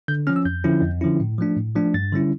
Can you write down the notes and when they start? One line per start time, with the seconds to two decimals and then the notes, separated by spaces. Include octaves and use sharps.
0.08 D3 G6
0.27 F3 C#4 F6
0.36 E6
0.45 F2 G6
0.64 D3 F3 C#4 E4
0.82 F2
1.01 D3 F3 C#4 E4
1.20 A2
1.38 F3 A3 D4
1.57 A2
1.76 F3 A3 D4
1.94 G2 A6
2.13 D3 G3 C#4 E4